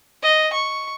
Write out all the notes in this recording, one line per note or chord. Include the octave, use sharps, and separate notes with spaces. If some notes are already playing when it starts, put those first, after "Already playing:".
D#5
C#6